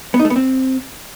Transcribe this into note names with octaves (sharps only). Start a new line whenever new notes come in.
B3
D#4
A3
B3
C4